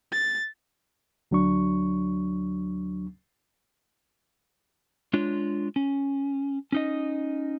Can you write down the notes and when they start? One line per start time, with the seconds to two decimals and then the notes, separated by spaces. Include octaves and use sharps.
0.12 A6
1.31 D2 F#3 D4 C#6
5.13 G#3 D4 F4 C#5
5.76 C#4
6.72 C#4 D#4 D#5